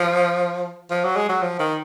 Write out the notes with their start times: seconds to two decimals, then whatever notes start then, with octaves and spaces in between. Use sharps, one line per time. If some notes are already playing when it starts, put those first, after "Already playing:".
Already playing: F3
0.90 F3
1.04 F#3
1.16 G#3
1.29 F#3
1.42 F3
1.60 D#3